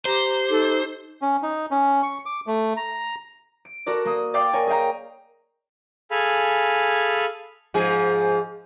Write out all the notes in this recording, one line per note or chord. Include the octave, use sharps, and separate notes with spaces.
G4 C5 A#5
D#4 A4
C#4
D#4
C#4
C#6
D6
A3
A#5
D7
F#4 A4 A#4 D5
A#3 D#6 D#7
D5 F5 G5 D6 C7
A#4 C#5 G#5
G#4 D#5 F5 G5 A#5
G#4 A4 F5 G#5 B5
G#2 F3 G#4